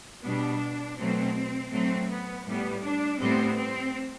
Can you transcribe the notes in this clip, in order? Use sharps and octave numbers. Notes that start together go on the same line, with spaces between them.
B2 G3 B3 D4
B2 F#3 A3 C4
A2 F#3 A3 C4
B3
A2 G3 B3
D4
A2 G3 B3 C4
C4